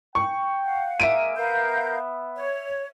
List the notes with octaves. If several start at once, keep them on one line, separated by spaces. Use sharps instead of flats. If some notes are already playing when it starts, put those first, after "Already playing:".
G5 C#6
F5 F#5
G#3 A#3 E5 D7 D#7
B3 A#4 F5 G6
C#5